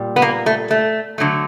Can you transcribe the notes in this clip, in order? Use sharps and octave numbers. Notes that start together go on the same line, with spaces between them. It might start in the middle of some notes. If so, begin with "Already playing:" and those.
Already playing: A#2 G3
B3
A#3
A3
A3
D3 F#3 A3